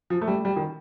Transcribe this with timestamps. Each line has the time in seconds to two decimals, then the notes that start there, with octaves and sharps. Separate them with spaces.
0.10 F3
0.21 A3
0.27 G3
0.45 G3
0.56 D#3